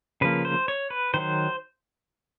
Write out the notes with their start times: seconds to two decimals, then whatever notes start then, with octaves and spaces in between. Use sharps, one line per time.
0.21 C#3 F3 A#3 B4
0.45 C5
0.68 C#5
0.90 B4
1.14 D#3 F#3 C5